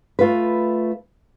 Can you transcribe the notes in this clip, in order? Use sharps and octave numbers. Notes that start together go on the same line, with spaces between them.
A3 F4 B4